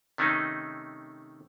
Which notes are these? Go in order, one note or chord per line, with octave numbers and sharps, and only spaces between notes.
C3 D#3 A3 C#4 D#4